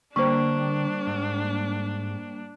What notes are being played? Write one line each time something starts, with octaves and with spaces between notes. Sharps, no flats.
D3 G3 A#3 D4 C5 C#6
G#2